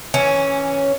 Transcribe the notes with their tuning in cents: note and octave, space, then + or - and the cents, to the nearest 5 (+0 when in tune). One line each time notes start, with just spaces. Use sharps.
E3 +0 C#4 +0